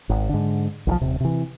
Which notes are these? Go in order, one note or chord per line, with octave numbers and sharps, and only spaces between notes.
G#1
G#2 D3
B1 D#3 F3
D#1 C3
C3 E3